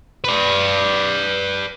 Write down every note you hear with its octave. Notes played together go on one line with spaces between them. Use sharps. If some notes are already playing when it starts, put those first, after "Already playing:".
B4 D5